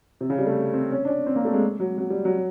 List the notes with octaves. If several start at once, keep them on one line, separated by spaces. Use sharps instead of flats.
C3
C#3
G3
A3
C4
C#4
D4
C#4
C4
A#3
A3
G#3
F#3
F#3
G3
F#3